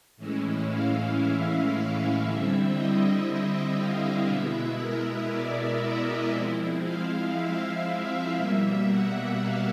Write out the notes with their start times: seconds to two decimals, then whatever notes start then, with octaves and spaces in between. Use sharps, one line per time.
0.17 A2 E3 G#3 C#4 E4
0.69 F5
1.20 E5
2.23 D3 G3 C4 E4
2.73 D#5
3.25 E5
3.76 F5
4.27 B2 G#3 B3 E4 E5
4.79 A#4
5.30 D5
5.81 D#5
6.32 F3 G#3 C4 E4
6.83 F5
7.35 E5
8.37 B2 G3 A#3
8.88 F#5
9.40 F5